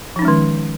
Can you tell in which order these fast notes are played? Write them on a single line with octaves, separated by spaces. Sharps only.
F3 D#4 C#4 G#3 D#3